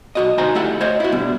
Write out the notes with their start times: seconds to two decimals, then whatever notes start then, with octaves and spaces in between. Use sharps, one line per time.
0.15 B1 F#4 D#5
0.38 D2 D#4 F#4 C5 G#5 A#5
0.55 A3 E4 G4 A4 F#5
0.81 C5 C#5 D#5 F5
1.00 E4 F#4
1.12 B2 D3 G3 B3